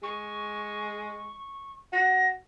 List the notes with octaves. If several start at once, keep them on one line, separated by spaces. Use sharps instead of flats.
G#3 C#6
F#4 A#6